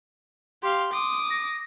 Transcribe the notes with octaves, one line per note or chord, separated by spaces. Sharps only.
G4 F5 C6
D6 D#6
A#6